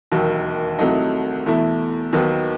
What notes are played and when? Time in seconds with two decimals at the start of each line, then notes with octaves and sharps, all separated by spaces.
0.12 E1 D#2 D#3 F#3
0.78 C2 C3 F#3 A3 D#4
1.46 E2 B2 A3 E4
2.13 D#2 D#3 F#3 B3